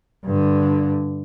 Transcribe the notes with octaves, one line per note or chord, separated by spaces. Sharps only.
G2 D3